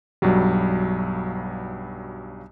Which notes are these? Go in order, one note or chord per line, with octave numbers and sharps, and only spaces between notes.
B1 G2 F#3 G3